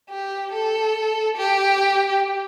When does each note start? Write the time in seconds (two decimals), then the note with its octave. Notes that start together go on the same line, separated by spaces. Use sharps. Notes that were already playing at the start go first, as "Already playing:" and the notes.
0.10 G4
0.53 A4
1.37 G4